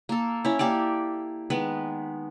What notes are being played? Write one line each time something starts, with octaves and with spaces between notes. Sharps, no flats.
A#3 A4
C#4 E4
A#3 G4 A4 D5
D#3 G#3 B3 B4